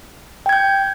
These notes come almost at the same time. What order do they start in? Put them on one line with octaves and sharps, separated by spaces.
G5 G#6 G6